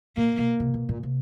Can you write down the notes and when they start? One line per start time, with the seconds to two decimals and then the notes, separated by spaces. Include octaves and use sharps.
0.16 A#2 A#3
0.38 B2
0.60 C3
0.74 B2
0.89 A#2
1.03 C3